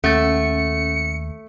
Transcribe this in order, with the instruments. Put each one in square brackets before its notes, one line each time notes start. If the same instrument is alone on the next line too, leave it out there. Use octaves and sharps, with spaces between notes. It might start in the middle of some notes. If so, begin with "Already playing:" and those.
[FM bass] D#2 [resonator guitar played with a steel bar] A3 [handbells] C#4 A6 [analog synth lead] C#7